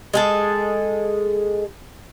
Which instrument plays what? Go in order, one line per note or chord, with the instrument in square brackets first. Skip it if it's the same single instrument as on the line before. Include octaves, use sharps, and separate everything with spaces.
[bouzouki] G#3 G#4 A4